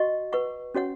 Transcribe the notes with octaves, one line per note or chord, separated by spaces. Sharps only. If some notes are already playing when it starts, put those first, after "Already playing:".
Already playing: F#4 D#5 F#5 C#6
B4 F#5 C#6
C#4 F#4 C#5 F#5